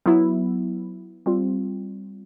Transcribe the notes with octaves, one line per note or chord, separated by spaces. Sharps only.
F#3 B3 E4
G3 C4 F4